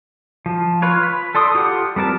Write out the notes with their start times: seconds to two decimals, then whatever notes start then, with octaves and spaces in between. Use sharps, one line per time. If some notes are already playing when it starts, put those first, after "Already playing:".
0.46 F3
0.82 F4 B4 C#5
1.03 B5
1.35 A4 D5 C6 D#6
1.55 F4 G4 A4 F#5
1.96 G3 C4 A#4 A5